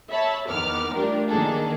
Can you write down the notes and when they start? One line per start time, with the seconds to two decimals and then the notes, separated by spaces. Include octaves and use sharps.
0.11 C#5 E5 A5 B5
0.49 E2 D#3 B3 D6 F6
0.94 G3 A3 D4 F4 G4 A#4
1.28 D#3 E3 A#3 D4 G#4 A4